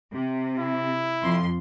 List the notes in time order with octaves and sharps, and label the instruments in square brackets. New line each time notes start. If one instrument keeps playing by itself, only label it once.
[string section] C3
[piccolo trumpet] E4
[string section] F2 C6